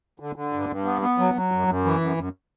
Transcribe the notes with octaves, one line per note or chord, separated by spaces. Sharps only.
D3
D3
G2
G2
B3
B3
F#3
F#3
F#2
F#2
E3
F#2
F#2